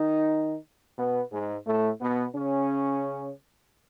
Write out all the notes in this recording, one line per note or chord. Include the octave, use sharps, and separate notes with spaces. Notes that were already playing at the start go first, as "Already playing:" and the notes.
Already playing: D#3 D#4
B2 B3
G#2 G#3
A2 A3
B2 B3
C#3 C#4